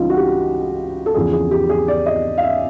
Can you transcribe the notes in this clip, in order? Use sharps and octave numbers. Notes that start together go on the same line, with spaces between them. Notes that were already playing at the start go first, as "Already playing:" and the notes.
Already playing: C#2 C#3 E3 G3 D#4 F4
F#4
G4
A4
E2 C#3 F3 G#4
G#4
G4
G#4
D5
D#5
F5
E5